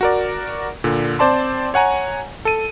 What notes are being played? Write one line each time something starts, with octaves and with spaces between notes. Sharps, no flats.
F#4 A#4 D5
A#2 D3
C4 C5 D5 A5 C6
C#5 F#5 G#5 A#5
A4 D#7